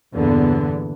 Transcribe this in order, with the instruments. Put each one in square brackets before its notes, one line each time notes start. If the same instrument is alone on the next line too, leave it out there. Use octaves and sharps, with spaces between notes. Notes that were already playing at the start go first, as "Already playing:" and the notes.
[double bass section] E2 G2 A#2 D3 B3